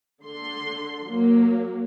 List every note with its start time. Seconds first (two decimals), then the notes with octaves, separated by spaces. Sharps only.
0.23 D3 C6
1.08 F#3 A#3